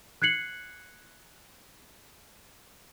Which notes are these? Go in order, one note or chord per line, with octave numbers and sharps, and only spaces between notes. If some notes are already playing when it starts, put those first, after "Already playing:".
F#6 G#6 C7 C#7 F#7